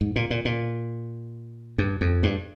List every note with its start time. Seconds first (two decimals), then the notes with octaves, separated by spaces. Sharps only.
0.01 G#2
0.16 A#2
0.30 A#2
0.45 A#2
1.78 G2
2.01 F2
2.23 G2